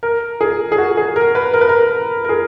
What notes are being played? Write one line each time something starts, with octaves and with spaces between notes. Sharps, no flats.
A#4
G#4
G#4
F#4
G#4
A#4
B4
A#4
B4
A#4
A#4
G#4